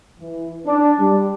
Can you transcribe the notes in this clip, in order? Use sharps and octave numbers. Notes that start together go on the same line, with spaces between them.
E3
D4
G3